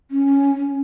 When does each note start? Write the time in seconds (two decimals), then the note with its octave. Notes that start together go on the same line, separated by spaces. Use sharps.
0.11 C#4